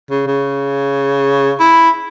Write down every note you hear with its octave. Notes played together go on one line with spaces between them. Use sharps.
C#3
C#3
E4